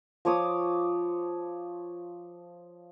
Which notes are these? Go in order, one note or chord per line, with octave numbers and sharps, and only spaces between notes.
F3 C#5 D6 D#6